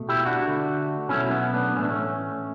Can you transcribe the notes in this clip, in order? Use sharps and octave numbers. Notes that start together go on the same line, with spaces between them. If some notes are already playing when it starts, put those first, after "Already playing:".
Already playing: B2 A3
E4 G4
D4 F#4
D3 A3
B2 F#3 A3 C#4 E4
B3
B3 D4
A2 E3 A3 C#4
D4
A3 C#4